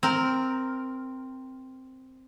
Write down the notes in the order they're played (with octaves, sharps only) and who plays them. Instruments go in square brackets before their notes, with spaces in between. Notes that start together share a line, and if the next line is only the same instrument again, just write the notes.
[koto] C4 A#4